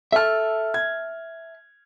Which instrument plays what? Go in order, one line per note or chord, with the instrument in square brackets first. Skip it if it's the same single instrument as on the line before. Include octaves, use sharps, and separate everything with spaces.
[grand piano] A4 F6 [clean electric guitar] E5 A5
[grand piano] G#6